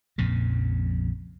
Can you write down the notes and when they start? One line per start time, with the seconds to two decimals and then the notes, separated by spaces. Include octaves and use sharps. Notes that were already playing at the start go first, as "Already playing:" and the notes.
0.18 A#1 F2 A#2 C#3